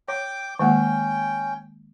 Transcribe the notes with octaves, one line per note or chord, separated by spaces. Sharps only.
C#5 G5 D6
D#3 G#3 A#3 C#4 G5